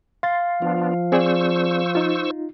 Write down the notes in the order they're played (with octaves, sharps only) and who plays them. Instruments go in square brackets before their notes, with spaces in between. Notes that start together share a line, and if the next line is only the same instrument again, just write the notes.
[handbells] F5 [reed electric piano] C6 A6
[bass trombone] F3 [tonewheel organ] B3 D4 F4
[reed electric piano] C4 G#4 D5 [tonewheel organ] C5 C#6 E6
[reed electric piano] D#4 F4